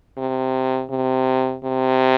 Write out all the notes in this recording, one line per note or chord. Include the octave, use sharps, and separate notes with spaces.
C3
C3
C3